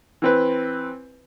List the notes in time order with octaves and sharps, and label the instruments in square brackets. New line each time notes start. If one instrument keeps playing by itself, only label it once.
[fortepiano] E3 C4 B4